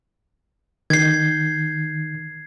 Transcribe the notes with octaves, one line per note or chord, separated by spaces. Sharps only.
D#3 G6 G#6 C7